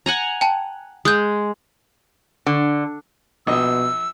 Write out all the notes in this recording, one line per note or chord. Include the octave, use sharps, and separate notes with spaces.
F#5 G#5 A#5
G5 A5
G#3 D#6 F#6 G6
D3
A#1 B2 D#5 E6